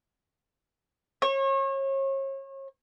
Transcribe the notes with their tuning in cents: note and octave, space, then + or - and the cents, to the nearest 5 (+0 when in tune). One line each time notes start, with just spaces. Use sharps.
C#5 -35